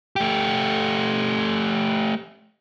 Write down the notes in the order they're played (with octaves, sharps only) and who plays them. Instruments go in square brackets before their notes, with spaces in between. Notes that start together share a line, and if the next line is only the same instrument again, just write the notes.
[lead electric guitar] A3 G4